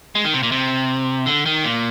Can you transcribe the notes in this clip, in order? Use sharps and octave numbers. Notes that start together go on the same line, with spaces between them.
G#3
D#3
C3
A#2
C3
D3
D#3
A#2